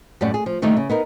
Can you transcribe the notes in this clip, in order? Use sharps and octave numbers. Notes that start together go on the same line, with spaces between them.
F#2 A2 G3 A3 D5 F#5
G#4
F3
D3 D#3 G3 A3 A#3 D#4
C#3
B3 D#4 A#4